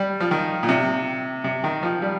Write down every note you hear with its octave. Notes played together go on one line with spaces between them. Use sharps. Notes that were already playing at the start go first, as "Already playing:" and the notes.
Already playing: G3
F3
D#3
A#2
C3
C3
D#3
F3
G3